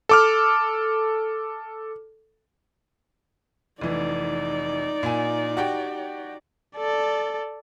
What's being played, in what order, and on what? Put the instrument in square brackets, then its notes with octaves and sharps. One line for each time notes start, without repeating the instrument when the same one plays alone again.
[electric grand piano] A4 D6 F6
[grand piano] F1 E3 [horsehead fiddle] D#4 D5
[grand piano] A#2 G#5
F#4 G4 G5
[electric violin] A4 D5